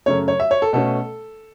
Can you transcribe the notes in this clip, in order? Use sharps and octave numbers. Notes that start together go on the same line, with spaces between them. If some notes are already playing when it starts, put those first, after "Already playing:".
F#2 C#3 A3 C#5
C#5
E5
C#5
A4
B2 A3 C#4 A4